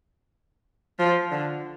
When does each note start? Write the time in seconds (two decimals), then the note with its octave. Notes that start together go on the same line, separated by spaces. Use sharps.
0.99 F3
1.31 D3